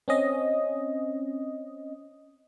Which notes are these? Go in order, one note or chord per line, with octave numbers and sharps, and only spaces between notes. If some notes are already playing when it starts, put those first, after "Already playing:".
C4 C#4 D#5